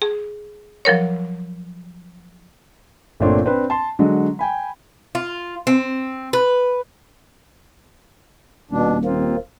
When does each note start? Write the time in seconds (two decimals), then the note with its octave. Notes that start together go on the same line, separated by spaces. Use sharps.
0.02 G#4
0.85 F3 F#3 A#4 C#5
3.20 G1 A#2 A3 C4 D4 C#5
3.46 C4 D4 B4
3.70 A5 C6
3.99 D3 F#3 G#3
4.39 G5 G#5 B5
5.15 F4
5.67 C4
6.33 B4
8.71 D#1 B2 D4
9.05 D#2 A#3 C4 F4